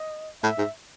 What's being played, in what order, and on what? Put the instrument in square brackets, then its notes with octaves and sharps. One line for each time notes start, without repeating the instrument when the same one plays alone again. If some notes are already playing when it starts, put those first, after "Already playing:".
Already playing: [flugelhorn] D#5
[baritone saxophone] A2 [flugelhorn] E5
[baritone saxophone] G#2